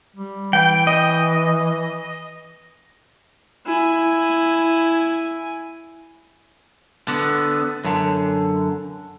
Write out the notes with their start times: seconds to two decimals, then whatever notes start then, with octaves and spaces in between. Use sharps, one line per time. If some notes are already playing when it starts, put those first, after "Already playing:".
0.16 G3
0.53 E3 G5
0.87 D#5
3.66 E4 G#5
7.08 D3 B3
7.85 F#2 D3